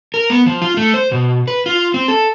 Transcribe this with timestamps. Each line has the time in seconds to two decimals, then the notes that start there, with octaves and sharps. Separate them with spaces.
0.14 A#4
0.30 B3
0.46 F3
0.62 F4
0.77 A3
0.94 C5
1.12 B2
1.48 B4
1.66 F4
1.94 C4
2.08 A4